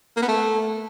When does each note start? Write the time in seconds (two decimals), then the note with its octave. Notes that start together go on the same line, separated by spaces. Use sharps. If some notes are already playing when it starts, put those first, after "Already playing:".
0.17 A#3
0.22 B3
0.28 A3